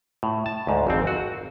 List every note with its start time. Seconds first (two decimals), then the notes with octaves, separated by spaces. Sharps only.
0.23 A2
0.46 A5
0.67 D2 G#2
0.87 G#1 F2 C4
1.07 F#4